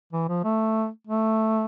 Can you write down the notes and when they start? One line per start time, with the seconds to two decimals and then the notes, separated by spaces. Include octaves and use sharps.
0.13 E3
0.28 F3
0.44 A3
1.07 A3